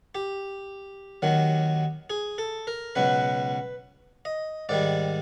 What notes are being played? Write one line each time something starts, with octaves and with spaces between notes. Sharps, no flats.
G4
D#2 D#3 F#3
G#4
A4
A#4
C#2 B2 F#3 B4
D#5
G#2 D#3 G3 D5